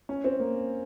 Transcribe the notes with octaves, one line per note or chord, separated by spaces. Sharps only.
C#4
C4
A#3